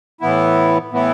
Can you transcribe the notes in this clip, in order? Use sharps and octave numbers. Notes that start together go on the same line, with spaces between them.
A2 E3 B3 E4
A2 E3 B3 E4